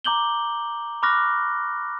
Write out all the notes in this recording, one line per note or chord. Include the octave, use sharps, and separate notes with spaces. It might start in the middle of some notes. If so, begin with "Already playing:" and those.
A#5 D6 G6 F#7 G7
B5 C#6 D6 F6 F#6 A#6